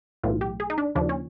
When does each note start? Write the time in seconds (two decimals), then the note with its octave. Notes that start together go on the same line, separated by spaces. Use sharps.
0.24 B1 A2 E3 F4
0.41 G4
0.60 G#4
0.70 D#4
0.78 D4
0.95 D#2 C#3 F3 D4
1.09 C#4